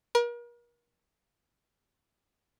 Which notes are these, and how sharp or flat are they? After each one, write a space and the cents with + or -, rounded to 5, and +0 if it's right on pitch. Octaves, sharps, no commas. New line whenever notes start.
A#4 +40